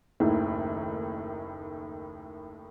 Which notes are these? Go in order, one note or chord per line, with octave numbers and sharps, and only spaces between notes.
F#1 D#2 A2 D#3